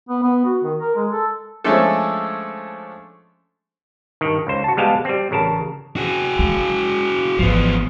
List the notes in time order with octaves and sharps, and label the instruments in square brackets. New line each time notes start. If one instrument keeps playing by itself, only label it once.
[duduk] B3
B3
F#4
D#3
A#4
G#3
A4
[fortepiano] F3 G#3 A3 C#4 D4 A4
[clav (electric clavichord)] G2 D#3
C#2 C5
F#4 A5
G3 G#3 B3 F5 G5 A5
G3 C4
A1 C#3 A#4 A5
[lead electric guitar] F#4 G#4
[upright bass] G#3
[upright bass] G#1 E3 [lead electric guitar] F3 B3